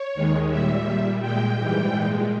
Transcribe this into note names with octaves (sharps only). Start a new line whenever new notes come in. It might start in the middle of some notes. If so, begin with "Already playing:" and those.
Already playing: C#5
D#2 D#3 G#3
A#2 G3 E5
A#2 G3
A#2 G#3 G5
G#2 E3 G3
A#2 G#3